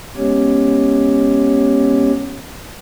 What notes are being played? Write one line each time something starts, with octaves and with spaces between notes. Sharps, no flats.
G#3 B3 C#4 G4 C#5